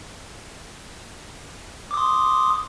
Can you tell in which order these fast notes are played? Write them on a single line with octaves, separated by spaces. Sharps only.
D6 D#6 C6